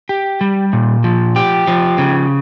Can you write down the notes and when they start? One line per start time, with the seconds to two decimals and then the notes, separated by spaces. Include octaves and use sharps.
0.09 G4
0.41 G3
0.73 A#2
1.04 F3
1.36 G4
1.67 F3
1.98 C#3